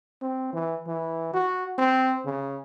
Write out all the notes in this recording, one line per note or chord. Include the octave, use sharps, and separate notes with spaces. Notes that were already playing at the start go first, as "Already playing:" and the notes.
C4
E3
E3
F#4
C4
C#3